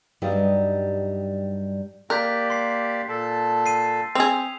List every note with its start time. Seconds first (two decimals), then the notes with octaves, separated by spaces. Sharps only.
0.22 G2 F#3 G3 D#4 D#5
2.10 A#3 G4 A#4 D5 F#6 G6 B6
2.50 C6 C7
3.09 A#2 A4 A5
3.66 C7 D#7
4.15 C4 G#4 D#6 E6 F7